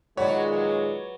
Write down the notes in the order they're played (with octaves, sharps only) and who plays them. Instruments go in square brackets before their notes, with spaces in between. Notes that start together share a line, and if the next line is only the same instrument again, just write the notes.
[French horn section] A#2 D#3 G#3 [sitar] F#3 F#4 [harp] B4 D5 [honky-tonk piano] C#5
[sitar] F#3